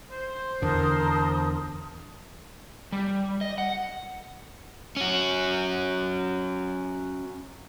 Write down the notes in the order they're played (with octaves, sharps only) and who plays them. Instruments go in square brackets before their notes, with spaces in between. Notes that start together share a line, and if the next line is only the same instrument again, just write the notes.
[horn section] C5
[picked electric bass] E2 D3 [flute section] A#4 A5 D#6
[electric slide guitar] G3
D#5
F#5
[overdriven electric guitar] C#4 F#4